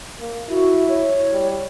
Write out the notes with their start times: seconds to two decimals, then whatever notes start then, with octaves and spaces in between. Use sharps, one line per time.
0.20 A#3
0.49 E4 F#4
0.89 C#5
1.33 G3